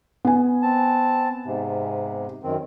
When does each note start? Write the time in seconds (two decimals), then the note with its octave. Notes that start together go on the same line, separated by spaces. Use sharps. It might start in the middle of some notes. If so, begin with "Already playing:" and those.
0.25 B3 G#5
0.63 C4 A5
1.46 G#2 C3
2.43 F#2 D#3 C4